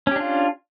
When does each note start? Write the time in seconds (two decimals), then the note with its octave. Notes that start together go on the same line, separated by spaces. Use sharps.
0.07 C#4
0.11 G4
0.16 D4
0.20 F4